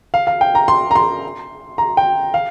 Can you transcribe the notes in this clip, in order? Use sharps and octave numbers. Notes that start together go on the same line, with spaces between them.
F5
F5
G5
A#5
C6
A#5
C6
A#5
G5
F5